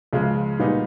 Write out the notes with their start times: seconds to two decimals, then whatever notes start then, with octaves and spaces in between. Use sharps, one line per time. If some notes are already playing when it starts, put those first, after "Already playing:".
0.13 C#2 C#3 F3 G#3
0.59 A#2 G3 B3 D#4